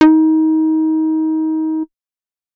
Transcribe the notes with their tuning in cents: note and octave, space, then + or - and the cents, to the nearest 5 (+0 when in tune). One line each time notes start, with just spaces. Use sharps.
D#4 +25